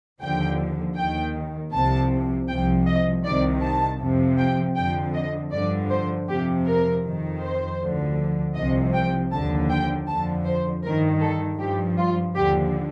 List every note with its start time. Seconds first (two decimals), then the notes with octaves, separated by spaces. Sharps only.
0.21 D#2 D3 F3 G5
0.97 D#2 D#3 G5
1.73 C2 C3 F3 A5
2.49 C2 C3 F3 G5
2.87 D#5
3.25 C2 C3 D#3 D5
3.63 A5
4.00 F2 C3 F3
4.38 G5
4.76 F2 D3 F3 G5
5.14 D#5
5.52 G2 D3 F3 D5
5.90 C5
6.28 F2 C3 F3 G4
6.66 A#4
7.04 F2 D#3
7.42 C5
7.80 D2 D3 F3
8.56 C2 C3 F3 D#5
8.94 G5
9.32 D#2 D3 F3 A5
9.70 G5
10.08 F2 D3 F3 A5
10.45 C5
10.83 G2 D#3 A#4
11.22 A4
11.59 G2 F3 G4
11.98 F4
12.35 D#2 D3 F3 G4